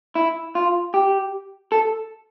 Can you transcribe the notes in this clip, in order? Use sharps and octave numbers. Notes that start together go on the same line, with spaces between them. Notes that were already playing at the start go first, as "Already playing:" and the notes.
E4
F4
G4
A4